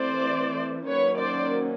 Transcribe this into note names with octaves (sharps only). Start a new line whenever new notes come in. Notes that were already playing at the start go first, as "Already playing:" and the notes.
Already playing: E3 A3 C4 C5 D5
D#3 F#3 A#3 C#4 B4 C#5
C5 D5